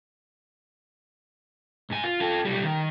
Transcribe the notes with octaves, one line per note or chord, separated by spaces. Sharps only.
G#2 G#5
F4
F4 A4
B1 G3
D#3